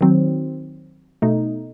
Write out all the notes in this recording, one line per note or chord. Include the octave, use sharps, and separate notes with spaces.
D#3 F#3 C4
B2 A3 D#4